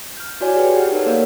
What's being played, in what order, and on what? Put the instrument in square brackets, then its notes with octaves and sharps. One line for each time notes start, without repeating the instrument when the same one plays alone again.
[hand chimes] F6 G6
E4 F#4 C#5 D5 G#5
G4 G#4 B4 G5
G4 F#5 F6
D#4 G4 A4 A#4 C#5 D5
A#3 A#4 C#5 F5 F#5